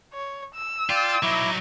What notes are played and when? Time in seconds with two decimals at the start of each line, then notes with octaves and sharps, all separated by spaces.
0.13 C#5
0.55 E6
0.90 F4 D5 G5
1.23 F#3 D#4 E4 D6